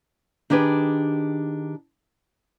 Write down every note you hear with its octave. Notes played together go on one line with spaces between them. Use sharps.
D#3 D4 G4 G#4 B4